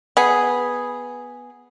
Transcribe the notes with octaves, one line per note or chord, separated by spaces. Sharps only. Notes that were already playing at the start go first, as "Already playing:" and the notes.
B3 G#4